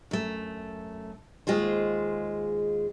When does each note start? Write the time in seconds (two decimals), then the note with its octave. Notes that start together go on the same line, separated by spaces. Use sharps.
0.11 F#2 A3
1.47 D#2 G#3 F4 G#4 C5